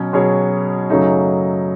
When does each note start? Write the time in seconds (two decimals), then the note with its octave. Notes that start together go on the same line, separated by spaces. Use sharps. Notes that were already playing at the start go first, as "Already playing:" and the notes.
Already playing: B2 F#3 C#4
0.13 B2 F#3 C#4 G#4 C#5
0.90 F#2 C#3 F#3 A3 D#4